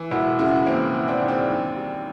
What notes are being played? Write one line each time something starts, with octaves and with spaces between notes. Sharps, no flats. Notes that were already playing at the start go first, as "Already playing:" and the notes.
Already playing: E3
E1 E4 F#4
C#3 E4 F#4
E1 A#3 C4
E3
C4 D4
D#2
C4 D4
D#2
G3